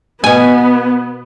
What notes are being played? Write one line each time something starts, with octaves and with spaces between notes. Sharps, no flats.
B2 B3 G#5